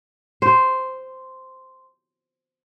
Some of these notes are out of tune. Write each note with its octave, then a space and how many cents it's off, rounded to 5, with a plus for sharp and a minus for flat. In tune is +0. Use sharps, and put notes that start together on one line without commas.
C5 -5